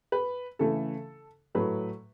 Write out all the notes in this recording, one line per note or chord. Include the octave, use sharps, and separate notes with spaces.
B4
C#3 E3 A3 A4
A2 F#3 A3 B4